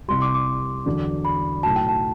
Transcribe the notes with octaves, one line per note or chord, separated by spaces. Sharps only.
C2 C3 G3 C6
D6
D6
E2 D3 F#3
B5
B1 A2 F#3 A5
G5
A5